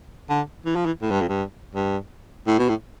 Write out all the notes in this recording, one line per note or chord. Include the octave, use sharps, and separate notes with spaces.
D3
E3
F3
E3
A2
G2
F2
G2
G2
A2
B2
A2